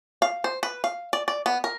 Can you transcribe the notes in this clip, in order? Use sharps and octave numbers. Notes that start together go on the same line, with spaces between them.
F5
C5
B4
F5
D5
D5
B3
A#4